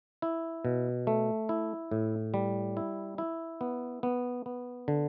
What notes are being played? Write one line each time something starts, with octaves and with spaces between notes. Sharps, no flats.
E4
B2
A3
E4
A2
G3
E4
E4
B3
B3
B3
D3